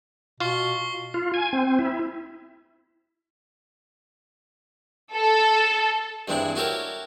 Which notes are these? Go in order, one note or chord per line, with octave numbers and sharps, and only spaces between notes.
B2 F4 C#6 C7 G7
F4
G#5
C4
E4
A4
G2 E3 G#3 C4 D4 E4
E4 F#4 G4 A4 A#4 C#5